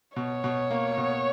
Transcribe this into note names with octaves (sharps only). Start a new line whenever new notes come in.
B2 C#5
B2
A#3
B2